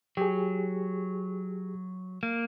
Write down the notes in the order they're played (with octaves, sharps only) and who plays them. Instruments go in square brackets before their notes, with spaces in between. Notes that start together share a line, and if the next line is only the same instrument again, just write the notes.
[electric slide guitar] F#3 [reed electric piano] G4 G#4
[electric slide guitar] A#3